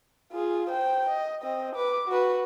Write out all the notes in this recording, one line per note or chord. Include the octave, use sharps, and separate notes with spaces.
F4 G#4
C5 G5
D#5
C4 D#5
B4 D6
F#4 B4